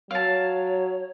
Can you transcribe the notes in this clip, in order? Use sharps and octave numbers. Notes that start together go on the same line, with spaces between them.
F#3 C#5 F5 A5